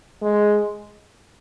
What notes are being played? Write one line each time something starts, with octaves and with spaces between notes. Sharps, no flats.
G#3